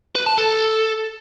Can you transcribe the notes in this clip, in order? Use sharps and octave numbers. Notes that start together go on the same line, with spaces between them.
B4
A5
A4